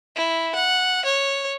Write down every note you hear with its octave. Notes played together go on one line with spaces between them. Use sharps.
E4
F#5
C#5